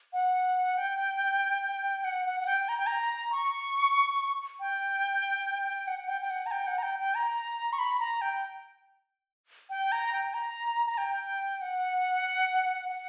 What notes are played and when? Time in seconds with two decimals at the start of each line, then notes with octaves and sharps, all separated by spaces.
0.13 F#5
0.77 G5
2.04 F#5
2.26 F#5
2.41 F#5
2.46 G5
2.69 A#5
2.77 G5
2.87 A#5
3.32 C#6
4.60 G5
5.87 F#5
6.08 G5
6.22 G5
6.30 F#5
6.46 A#5
6.51 G5
6.67 F#5
6.78 A#5
6.83 G5
6.99 G5
7.15 A#5
7.73 C#6
7.79 B5
8.00 A#5
8.21 G5
9.70 G5
9.92 A#5
10.12 G5
10.34 A#5
10.86 A#5
10.98 G5
11.61 F#5
12.89 F#5